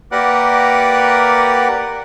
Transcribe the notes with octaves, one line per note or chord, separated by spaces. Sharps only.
A#3 G4 A#4 B4 D5 F#5